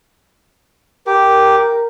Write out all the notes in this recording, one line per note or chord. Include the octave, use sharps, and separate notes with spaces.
G4 A#4